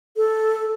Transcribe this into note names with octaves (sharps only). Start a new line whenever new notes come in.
A4